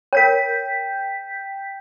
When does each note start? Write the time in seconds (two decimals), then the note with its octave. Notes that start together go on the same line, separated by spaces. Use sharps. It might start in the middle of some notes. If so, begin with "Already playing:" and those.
0.13 A#4 C#5 G5 G6 B6